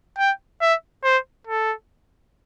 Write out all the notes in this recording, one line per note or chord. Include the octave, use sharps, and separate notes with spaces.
G5
E5
C5
A4